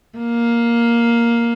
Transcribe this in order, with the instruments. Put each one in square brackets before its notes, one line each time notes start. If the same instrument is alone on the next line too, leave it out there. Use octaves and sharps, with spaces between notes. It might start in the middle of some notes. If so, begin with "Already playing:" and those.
[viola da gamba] A#3